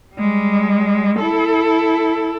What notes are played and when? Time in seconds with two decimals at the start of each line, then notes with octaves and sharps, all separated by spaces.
0.15 G3 G#3
1.19 E4 A4